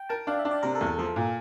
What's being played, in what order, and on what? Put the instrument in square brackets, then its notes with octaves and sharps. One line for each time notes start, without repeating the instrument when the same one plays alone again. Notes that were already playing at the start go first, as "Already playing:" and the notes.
Already playing: [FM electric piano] G5
[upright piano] A#4 [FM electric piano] A5
[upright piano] D4 [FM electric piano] F5
[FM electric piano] E5
[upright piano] D4
[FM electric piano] D5
[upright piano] C3 [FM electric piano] A#4
[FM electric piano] A4
[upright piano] E2
[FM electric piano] A4
[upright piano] F3 [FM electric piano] A4
[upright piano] A#2